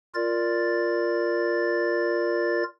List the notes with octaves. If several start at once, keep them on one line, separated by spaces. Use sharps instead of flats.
F4 A#4 D5 A6